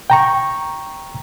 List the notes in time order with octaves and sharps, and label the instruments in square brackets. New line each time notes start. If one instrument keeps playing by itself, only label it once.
[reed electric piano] G5 A#5 C#6